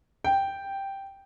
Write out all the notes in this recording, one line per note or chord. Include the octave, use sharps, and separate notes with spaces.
G5